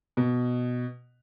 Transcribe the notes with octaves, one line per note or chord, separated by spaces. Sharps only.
B2